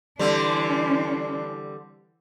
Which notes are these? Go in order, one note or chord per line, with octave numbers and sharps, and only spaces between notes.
D3 E3 G3 C4 D4